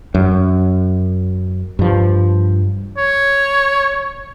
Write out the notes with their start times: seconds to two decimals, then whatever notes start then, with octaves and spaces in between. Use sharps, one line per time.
0.14 F#2
1.79 G2 F3
2.97 C#5